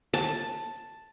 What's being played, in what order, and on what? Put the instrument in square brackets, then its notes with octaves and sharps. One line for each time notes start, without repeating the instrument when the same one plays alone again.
[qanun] A5